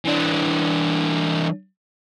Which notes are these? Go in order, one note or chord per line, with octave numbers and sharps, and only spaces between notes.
E3 D4